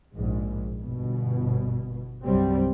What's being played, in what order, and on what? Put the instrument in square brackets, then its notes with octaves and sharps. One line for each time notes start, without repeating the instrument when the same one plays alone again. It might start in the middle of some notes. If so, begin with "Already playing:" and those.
[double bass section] A#1 G#2
G1 B2
C2 G2 C3 F#3 G3 C4